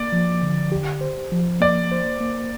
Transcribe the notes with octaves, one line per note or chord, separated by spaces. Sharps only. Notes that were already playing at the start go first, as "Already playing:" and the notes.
Already playing: A#3 D5
F3
D3
G4
C5
F3
A#3 D5
C5
A#3